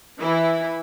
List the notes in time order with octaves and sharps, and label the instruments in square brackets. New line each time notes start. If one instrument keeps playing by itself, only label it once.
[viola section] E3 E4